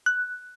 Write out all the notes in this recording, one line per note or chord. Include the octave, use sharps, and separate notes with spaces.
F#6